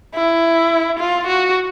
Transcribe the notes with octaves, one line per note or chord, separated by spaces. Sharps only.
E4
F4
F#4